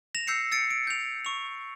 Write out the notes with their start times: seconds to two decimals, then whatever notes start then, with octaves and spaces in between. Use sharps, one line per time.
0.15 A#6 E7 F7
0.27 E6 G6 C7 C#7
0.52 E6 A6 C#7 D7
0.71 D7
0.87 G6 F7
1.25 C#6 F7